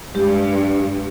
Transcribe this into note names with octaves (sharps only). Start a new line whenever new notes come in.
G2 G#3 G4